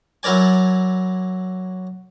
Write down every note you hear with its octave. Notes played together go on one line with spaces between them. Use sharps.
F#3 E4 A#4 D5 G#5